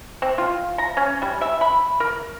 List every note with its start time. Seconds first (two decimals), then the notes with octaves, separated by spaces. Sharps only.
0.22 C4
0.38 F4
0.78 A#5
0.97 C#4
1.22 G3
1.41 E5
1.61 B5
2.00 A#4